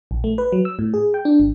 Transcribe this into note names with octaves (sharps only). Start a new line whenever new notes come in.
A#1
A3
B4
F#3
E6
A2
G#4
G5
D4
G#1